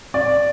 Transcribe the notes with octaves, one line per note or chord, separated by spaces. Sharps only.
D5